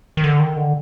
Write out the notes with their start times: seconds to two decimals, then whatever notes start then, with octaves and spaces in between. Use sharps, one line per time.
0.17 D#3
0.24 D3
0.40 D#3
0.56 D3